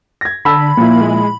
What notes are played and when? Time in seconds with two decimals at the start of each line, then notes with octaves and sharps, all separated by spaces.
0.21 G#6 A#6
0.45 D3 A5 B5 E6
0.77 A#2 F3 A#3 E4
1.01 G#3